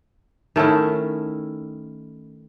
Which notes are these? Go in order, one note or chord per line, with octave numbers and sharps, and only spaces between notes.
D#3 A3 C#4 E4